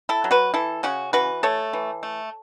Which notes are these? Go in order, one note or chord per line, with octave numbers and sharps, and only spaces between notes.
E4 A4
F#3
F#4 B4
E3 E4 A4
C#3 C#4 F#4
E3 F#4 B4
A3 A4 C#5
E3
A3